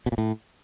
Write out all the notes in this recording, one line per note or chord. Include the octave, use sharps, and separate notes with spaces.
B2
A#2
A2